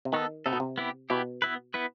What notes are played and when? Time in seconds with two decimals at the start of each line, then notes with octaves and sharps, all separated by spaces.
0.05 C3
0.13 D#3 B3 D#4 A4
0.46 C3 B3 D#4 A4
0.53 B2
0.60 C3
0.78 B3 E4 G4
1.10 B2 B3 E4 G4
1.42 B3 E4 B4
1.74 B3 E4 B4